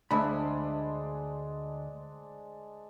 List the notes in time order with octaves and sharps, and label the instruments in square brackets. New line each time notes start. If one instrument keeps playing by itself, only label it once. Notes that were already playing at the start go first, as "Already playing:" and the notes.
[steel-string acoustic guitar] D2 [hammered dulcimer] G#3 D4 C5 [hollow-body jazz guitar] E5 B5